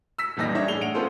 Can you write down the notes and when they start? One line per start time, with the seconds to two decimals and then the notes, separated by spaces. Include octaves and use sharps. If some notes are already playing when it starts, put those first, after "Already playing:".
0.18 E6 B6
0.37 D#1 A#2 E3 G3 D#4 A#6
0.55 D4 C#5 E5
0.68 A2 G#4 F7 G7
0.81 F#5 D7 F7
0.94 B3 C#4 F4 A4 C5